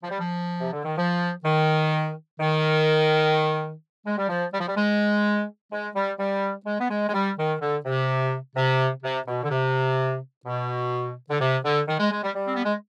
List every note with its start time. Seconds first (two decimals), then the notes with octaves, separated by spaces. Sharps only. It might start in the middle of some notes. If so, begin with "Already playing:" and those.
0.03 F3
0.11 G3
0.19 F3
0.60 C3
0.73 D3
0.85 D#3
0.98 F3
1.45 D#3
2.40 D#3
4.06 G#3
4.18 G3
4.29 F3
4.53 G3
4.60 F3
4.68 G3
4.77 G#3
5.72 G#3
5.96 G3
6.19 G3
6.66 G#3
6.80 B3
6.90 G#3
7.09 G#3
7.14 G3
7.38 D#3
7.61 D3
7.85 C3
8.56 C3
9.03 C3
9.27 B2
9.43 D3
9.51 C3
10.46 B2
11.30 D3
11.41 C3
11.64 D3
11.88 D#3
12.00 G#3
12.11 G#3
12.24 G3
12.35 G3
12.48 C4
12.56 B3
12.65 G#3